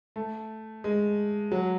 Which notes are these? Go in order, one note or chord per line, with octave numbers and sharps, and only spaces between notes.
A3
G#3
F#3